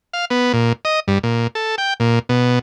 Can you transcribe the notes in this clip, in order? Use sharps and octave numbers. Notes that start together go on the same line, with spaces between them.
F5
B3
A#2
D#5
G2
A#2
A4
G5
A#2
B2